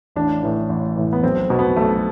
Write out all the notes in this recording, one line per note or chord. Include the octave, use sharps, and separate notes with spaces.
A1 D4
A2 E3
A1
A2 E3
B3
B1 C4
B2
B3
B1 A3